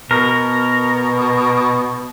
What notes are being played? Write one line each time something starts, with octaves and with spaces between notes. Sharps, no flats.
B2 A#4